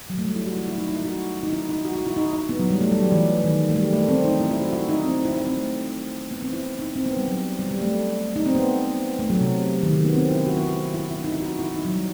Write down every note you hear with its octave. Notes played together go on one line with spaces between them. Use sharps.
F#3
A3
G3
E4
F#4
E4
E4
D#4
D#4
E4
F#4
D#4
E4
D#4
F#4
F#4
E4
D#4
D#4
B3
F#3
G3
A3
G3
F#3
E3
D#3
A3
G3
A3
C4
D#4
E4
E4
F#4
E4
D#4
C4
C4
E4
E4
C4
A3
B3
C4
E4
D#4
C4
B3
G3
F#3
G3
G3
A3
D#4
C4
B3
A3
F#3
C3
D#3
D#3
B3
C4
E4
F#4
E4
E4
E4
E4
D#4
E4
F#4
E4
D#4
F#3
G3